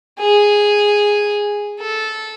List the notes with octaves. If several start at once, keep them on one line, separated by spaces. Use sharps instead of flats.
G#4
A4